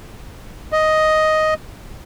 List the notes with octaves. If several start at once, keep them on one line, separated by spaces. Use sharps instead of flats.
D#5